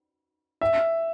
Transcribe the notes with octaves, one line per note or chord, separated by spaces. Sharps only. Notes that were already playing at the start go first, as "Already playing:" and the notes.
E5